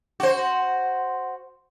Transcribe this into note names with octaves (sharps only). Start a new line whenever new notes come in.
F#4 C5